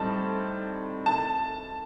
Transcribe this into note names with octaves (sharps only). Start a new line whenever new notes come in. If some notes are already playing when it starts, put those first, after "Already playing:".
Already playing: A2 G3 C4 D#4 A5
A5